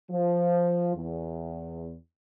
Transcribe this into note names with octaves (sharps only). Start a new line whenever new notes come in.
F3
E2